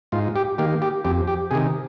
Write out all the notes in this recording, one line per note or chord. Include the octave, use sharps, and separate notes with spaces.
G#2 F4
G4
D#3 A#3 G4
G4
F2 G4
G4
C3 D#3 G#4